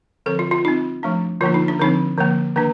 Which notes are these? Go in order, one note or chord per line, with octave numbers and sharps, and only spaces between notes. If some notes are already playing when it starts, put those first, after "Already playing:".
D3 F3 C4 A4
F4
F4
G3 C4 D#4
F3 A3 D4
D3 F3 A#3 D4 F4
D#4
D4
D3 F3 C4 D#4
D3 F3 A#3
D#3 A#3 D4